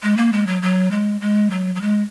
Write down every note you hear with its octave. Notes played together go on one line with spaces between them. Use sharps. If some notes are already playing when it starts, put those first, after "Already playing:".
G#3
A#3
G#3
F#3
F#3
G#3
G#3
F#3
F#3
G#3